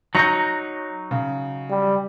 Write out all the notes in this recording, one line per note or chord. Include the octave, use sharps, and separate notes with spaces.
F#3 D#4 G6 A#6 C#7
C#3
G3